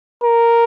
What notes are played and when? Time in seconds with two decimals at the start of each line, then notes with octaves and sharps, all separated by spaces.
0.23 A#4